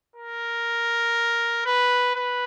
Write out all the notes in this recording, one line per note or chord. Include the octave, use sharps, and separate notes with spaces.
A#4
B4
B4